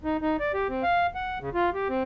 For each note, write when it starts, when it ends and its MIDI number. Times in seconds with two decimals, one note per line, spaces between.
0.04 0.17 63
0.22 0.37 63
0.40 0.52 74
0.54 0.67 67
0.69 0.83 60
0.83 1.07 77
1.15 1.39 78
1.40 1.50 49
1.54 1.70 65
1.74 1.88 67
1.89 2.03 60